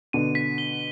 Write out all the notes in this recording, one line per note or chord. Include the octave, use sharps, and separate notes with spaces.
B2 D3 D#7
B6
G7